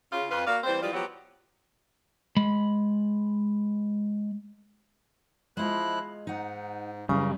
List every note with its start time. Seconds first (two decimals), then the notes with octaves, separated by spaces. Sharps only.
0.12 C#3 F4
0.31 F2 F4 B4
0.46 A#3 F#4 D5 F5
0.64 E3 G3 C4 C5
0.82 E3 F3 G3 G#3 F4
0.93 F3 F#3 B3 C4 G4 C#5
2.37 G#3 B5
5.57 F3 G#3 E4 F4 D#5 F#6
6.27 G#2 D#4 F#5
7.09 F#2 C#3 E3 G3 A#4